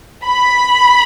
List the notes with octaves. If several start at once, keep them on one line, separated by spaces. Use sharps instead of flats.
B5